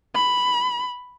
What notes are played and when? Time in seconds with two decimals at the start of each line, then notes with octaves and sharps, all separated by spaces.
0.15 B5